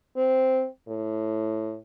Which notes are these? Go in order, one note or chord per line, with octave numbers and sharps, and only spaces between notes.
C4
A2